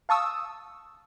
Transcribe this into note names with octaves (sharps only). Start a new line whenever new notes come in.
F5 A5 C#6 D#6 E6